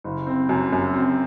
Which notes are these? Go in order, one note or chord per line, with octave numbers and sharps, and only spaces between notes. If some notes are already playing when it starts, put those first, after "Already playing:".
F#1
C4
F#2
F#2
C4